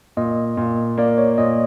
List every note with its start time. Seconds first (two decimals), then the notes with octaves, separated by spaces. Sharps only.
0.17 A#2 D#5
0.57 A#2
0.98 A#3 D5
1.18 C#5
1.38 A#2 D#5